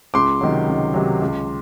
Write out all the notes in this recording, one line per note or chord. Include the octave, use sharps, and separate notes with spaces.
C#2 C6 D6
C3 D#3 F#3
C#2
C3 D#3 F#3
C#2